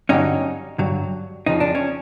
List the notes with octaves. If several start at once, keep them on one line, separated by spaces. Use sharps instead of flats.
G2 D3 F#3 C#4 D#4
G2 D3 F#3
F2 C#3 F3 D#4
D4
C#4